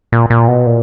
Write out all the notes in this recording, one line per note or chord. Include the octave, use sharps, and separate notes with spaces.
A#2
A#2
B2
A#2